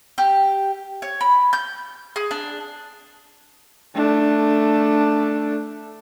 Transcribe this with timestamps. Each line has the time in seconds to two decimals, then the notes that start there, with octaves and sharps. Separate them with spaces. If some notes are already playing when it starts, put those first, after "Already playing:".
0.18 G4
1.02 C#5
1.21 B5
1.53 G6
2.16 G#4
2.31 D4
3.95 A3 D4